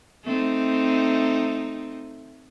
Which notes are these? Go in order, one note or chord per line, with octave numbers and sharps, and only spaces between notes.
A3 C4 D#4